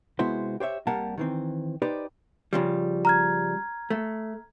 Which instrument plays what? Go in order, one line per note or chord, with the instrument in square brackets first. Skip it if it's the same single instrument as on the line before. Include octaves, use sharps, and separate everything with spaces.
[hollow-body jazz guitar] C3 G#3 B3 E4 F#4 C5
G4 C5 C#5 E5
C2 G3 A#3 A#4 F#5 A5
D#3 E3 C4
D#4 G4 B4 C5 D5
C#3 F3 G3
[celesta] A#5 F6 G#6
[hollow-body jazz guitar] A3